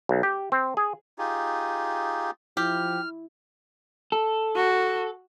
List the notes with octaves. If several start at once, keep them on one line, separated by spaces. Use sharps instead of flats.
B1
G4
C4
G#4
D#4 F4 G4 G#4
F3 E4 G4 F6
A4
F#4